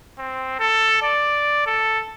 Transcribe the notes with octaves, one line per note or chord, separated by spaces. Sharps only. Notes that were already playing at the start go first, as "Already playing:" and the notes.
C4
A4
D5
A4